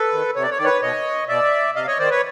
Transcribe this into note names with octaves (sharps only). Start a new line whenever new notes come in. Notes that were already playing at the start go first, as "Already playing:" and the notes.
Already playing: A4 B4
D#3
C3 C#5
D5
C#5
D#3 D5
B4 C#5
B2 C#5 D#5
B2 D5 E5
C3 D#5 F5
C#5 D#5
D#3 C5 D5
B4 C#5